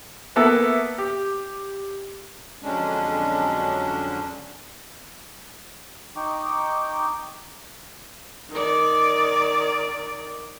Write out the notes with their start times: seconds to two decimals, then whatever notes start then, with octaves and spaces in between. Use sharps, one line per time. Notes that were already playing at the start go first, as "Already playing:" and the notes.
0.36 A#3 B3 E4 A4
0.98 G4
2.62 F2 D3 F#3 G#3 C#4 D4
6.16 D#4 G5 C#6 D6
8.51 D#3 D5